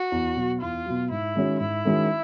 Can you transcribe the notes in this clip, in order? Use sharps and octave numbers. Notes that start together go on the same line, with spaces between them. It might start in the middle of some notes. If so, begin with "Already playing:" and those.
Already playing: F#4
E2
B2 F#3
E2 F4
B2 F#3
G#2 E4
D#3 G#3 C#4 F#4
G#2 E4
D#3 G#3 C#4 F#4